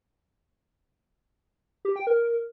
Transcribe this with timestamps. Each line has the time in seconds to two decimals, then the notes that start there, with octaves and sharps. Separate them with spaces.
1.85 G4
1.96 G5
2.07 A#4